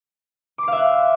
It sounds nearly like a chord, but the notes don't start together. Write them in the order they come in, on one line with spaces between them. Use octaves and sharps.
D6 C6 F5 E5 F#6